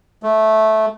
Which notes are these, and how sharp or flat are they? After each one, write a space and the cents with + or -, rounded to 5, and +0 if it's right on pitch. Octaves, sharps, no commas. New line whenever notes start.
A3 -10